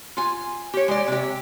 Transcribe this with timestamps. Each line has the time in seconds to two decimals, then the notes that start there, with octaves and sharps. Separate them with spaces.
0.17 F4 G#5
0.74 G4 C#5
0.88 G#3 D5
1.08 C3 G4